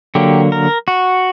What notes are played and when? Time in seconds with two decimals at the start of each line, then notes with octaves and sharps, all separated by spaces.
0.15 D3 F#3 A#3 G4
0.52 A#4
0.88 F#4